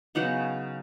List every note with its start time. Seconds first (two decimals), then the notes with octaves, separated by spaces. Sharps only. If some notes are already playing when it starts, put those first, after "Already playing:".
0.15 C#3 F#3 B3 D#4 F#5